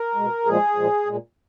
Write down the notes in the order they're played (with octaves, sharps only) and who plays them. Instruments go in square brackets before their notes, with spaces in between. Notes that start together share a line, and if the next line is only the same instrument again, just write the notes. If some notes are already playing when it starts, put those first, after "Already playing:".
Already playing: [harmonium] A#4
B2 G#3
A#2 F3 G#3 G#4
A#2 F3 G#3
A#2 G#3